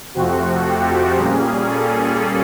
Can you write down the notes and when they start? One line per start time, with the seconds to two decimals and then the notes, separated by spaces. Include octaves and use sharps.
0.14 F2 C3 F3 A3 C4 F#4
0.66 G4
1.16 A#2 G3 A#3 C#4 G#4
1.66 A4